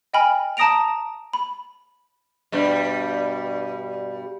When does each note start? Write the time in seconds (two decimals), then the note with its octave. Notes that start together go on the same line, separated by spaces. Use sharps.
0.14 D#5 G5 G#5 B5 F6
0.57 A5 A#5 D#6 A#6 D7 F7
1.33 B5
2.52 G2 B2 G3